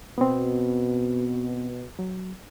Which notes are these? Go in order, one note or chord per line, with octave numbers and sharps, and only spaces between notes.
B2 B3 C4
F#3